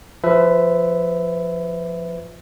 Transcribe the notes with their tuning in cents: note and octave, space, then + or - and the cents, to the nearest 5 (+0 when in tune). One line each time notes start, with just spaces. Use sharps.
F3 +0 B4 +20 E5 +0